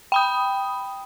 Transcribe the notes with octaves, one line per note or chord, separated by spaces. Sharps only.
G5 B5 D#6